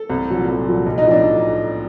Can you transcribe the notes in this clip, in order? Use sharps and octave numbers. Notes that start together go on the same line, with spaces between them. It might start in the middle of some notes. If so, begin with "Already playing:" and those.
Already playing: A4
C2
A#2 F#3
C2
A#2 F#3
B1
D#4
A2 F3
D4